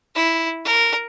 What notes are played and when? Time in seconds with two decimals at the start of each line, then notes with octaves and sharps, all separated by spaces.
0.15 E4
0.65 A#4